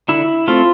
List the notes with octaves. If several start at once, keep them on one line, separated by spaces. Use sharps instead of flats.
D3 E4
A3 C4 F4